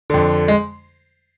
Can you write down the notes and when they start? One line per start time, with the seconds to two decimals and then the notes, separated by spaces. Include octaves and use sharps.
0.10 F2 D3
0.48 G#3